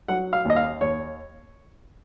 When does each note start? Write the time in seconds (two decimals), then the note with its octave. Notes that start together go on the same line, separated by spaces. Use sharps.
0.08 F#3 F#5
0.33 F5
0.45 D#2 D#5
0.56 F5
0.81 D#2 C#5